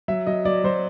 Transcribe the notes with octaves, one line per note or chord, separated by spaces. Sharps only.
F#3 E5
F#3 D#5
F#3 D5
F#3 C5